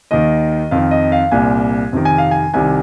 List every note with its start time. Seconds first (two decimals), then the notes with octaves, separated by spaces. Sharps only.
0.11 D#2 D#3 D#5
0.71 F2 D#3 F5
0.91 D#5
1.12 F5
1.31 C2 A#2 G#5
1.93 F2 C3 D#3
2.05 G#5
2.18 F5
2.31 G#5
2.54 C2 C3 D#3 G#5